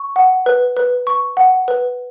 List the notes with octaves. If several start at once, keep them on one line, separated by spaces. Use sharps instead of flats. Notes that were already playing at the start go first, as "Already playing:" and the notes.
Already playing: C#6
F#5
B4
B4
C#6
F#5
B4